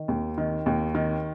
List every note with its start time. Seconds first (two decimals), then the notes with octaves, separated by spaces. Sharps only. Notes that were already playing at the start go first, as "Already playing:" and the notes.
Already playing: D#3
0.08 D#2
0.38 D#3
0.66 D#2
0.95 D#3